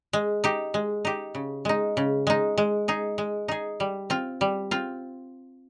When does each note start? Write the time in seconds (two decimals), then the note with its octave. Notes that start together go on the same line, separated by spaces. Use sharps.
0.13 G#3
0.44 D#4 G4
0.74 G#3
1.05 D#4 G4
1.35 C#3
1.65 G#3 D#4
1.97 C#3
2.27 G#3 D#4
2.58 G#3
2.88 D#4 G#4
3.18 G#3
3.48 D#4 G#4
3.80 G3
4.10 C4 F4
4.41 G3
4.71 C4 F4